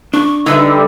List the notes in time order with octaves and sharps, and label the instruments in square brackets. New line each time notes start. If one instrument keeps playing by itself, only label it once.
[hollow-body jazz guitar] D4 [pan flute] C#6
[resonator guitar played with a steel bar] D3 [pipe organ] G3 [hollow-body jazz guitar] D#4 B4 E5 [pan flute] E6